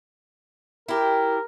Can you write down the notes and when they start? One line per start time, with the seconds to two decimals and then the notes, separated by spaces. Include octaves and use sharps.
0.88 E4 G4 A#4